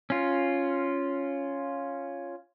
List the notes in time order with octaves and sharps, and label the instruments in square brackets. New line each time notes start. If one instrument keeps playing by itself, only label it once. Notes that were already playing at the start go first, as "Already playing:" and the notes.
[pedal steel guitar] C#4 F4